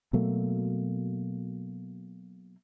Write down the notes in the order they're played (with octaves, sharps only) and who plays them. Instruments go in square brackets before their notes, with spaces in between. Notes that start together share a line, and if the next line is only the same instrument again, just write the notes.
[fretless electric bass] B2 F#3 A3 A#3